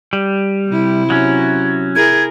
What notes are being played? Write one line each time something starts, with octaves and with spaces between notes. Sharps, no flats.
G3
C3 E4
F#3 C#4
E4 G#4 A#4 G#6